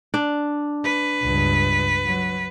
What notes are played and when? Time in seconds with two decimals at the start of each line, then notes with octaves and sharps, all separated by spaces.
0.14 D4
0.84 B4
1.22 C#2 G2
2.06 F#3